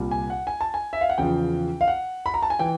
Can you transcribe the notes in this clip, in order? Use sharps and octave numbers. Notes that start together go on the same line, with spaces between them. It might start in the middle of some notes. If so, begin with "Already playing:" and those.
Already playing: C2 A#2 G3
G#5
F#5
G#5
A5
G#5
E5
F5
F#5
E2 C#3 F3 G5
F5
F#5
B5
A#5
A5
G#5
E3 G5